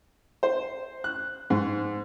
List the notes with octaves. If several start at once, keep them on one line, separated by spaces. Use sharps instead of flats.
C5
F#6
G#2